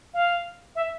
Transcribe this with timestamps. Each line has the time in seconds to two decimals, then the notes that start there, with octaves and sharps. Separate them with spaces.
0.14 F5
0.76 E5